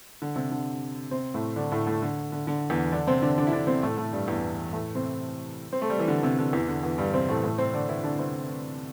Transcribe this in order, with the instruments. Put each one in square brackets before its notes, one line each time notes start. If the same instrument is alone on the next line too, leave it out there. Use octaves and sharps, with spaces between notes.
[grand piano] D3
C3
D3
C3 C4
A2 A3
D3 D4
A2 A3
A2 A3
D3
D3
D3
E2 E3
D3 D4
C3 C4
D3 D4
D3 D4
E4
D3 D4
C3 C4
A2 A3
A2 A3
G2 G3
E2 E3
A2 A3
C3 C4
C4
A3
G3
E3
D3
C3
D3
E2 E3
D3
E2 E3
G2 G3
C3 C4
A2 A3
A2 A3
C3 C4
D3 D4
E3 E4
D3 D4
C3 C4